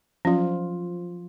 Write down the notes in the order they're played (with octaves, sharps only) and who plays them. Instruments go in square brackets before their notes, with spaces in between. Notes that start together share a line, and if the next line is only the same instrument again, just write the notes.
[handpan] F3 F4 [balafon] F#3 C#4